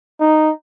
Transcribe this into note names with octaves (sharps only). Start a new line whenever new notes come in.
D#4